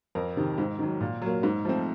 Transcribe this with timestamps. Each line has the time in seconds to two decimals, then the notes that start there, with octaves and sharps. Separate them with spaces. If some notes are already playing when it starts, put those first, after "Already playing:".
0.15 F2 A#4
0.37 C3 D#3
0.58 G#2
0.79 D#3 F#3
1.01 A#2
1.22 F#3 A#3
1.43 G#2
1.65 F3 A3 C4